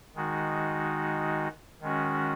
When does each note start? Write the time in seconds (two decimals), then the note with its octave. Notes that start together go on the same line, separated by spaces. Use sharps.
0.15 D#3 G#3 D#4 F#4
1.81 D#3 G#3 C#4 F#4